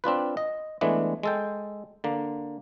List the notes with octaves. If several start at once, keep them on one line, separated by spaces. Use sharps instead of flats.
C4 D4 F4 B4
D#5
E3 G#3 A3 B3 D4
G#3 A4 G5
D3 A#3